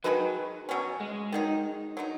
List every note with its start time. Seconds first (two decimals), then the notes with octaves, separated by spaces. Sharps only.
0.04 D#3 F#3 G#3 D#4 B4
0.69 B2 F#3 C#4
1.01 G#3
1.32 D#3 F#3 D#4
1.97 F#3 B3 D#4